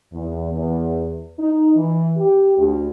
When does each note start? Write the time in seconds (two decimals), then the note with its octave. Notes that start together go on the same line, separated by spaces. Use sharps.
0.13 E2
0.52 E2
1.39 D#4
1.76 E3
2.18 G4
2.58 D2